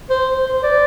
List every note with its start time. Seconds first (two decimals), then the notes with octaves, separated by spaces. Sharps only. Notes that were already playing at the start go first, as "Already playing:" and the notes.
0.10 C5
0.45 C5
0.63 D5